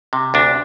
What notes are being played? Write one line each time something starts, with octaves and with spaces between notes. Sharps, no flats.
C3
D2 D4